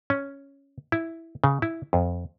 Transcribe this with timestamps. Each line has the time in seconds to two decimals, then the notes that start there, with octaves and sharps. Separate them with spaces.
0.10 C#4
0.92 E4
1.44 C#3
1.62 E4
1.93 F2